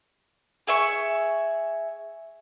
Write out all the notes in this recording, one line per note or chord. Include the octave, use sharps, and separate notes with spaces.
G#4 E5 C#6